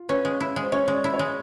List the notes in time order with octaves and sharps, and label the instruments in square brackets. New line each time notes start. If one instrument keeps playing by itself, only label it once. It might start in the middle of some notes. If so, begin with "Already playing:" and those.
Already playing: [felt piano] F4
[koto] C#4 [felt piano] B4
[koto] G#3
E4
G#3
[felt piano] C5
[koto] C#4 [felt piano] C#5
[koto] G#3 [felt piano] D5
[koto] E4
[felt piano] C#5
[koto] G#3